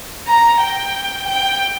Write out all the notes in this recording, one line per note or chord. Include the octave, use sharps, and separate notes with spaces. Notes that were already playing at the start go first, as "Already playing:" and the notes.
A#5
G5
G5